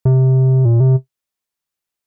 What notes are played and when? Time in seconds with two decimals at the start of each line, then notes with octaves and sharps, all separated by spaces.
0.05 C3
0.65 A#2
0.80 C3